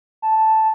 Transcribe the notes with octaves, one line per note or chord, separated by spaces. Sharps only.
A5